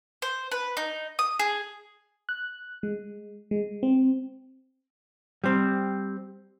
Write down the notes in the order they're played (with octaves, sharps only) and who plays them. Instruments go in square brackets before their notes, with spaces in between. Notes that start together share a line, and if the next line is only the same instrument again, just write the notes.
[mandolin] C5
B4
D#4
D#6
G#4
[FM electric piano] F#6
G#3
G#3
C4
[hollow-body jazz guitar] G3 C4